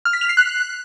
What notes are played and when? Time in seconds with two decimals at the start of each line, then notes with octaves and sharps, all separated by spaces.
0.05 F6
0.13 B6
0.21 F7
0.29 C7
0.37 F#6